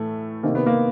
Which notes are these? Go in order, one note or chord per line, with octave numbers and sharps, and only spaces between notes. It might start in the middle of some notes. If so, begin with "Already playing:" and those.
Already playing: A2 E3 A3
C3 D#3 A#3
B3
A#3